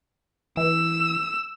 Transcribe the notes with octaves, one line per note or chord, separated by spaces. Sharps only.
E3 E6